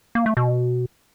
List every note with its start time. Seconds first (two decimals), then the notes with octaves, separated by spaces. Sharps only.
0.15 A#3
0.26 A3
0.37 B2